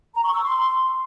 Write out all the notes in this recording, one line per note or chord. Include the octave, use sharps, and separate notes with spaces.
A#5
C#6
E6
C6